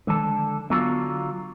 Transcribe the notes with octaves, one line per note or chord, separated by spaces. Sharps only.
D3 D#3 F3 G#3 A4
D3 F#3 B3 F4